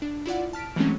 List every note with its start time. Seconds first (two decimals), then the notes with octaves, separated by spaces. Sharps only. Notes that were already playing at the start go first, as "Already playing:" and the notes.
0.02 D4
0.26 E4 F4 D5 F#5
0.53 A5 F6 B6 D7
0.76 E3 F#3 G#3 A3 C4 C#4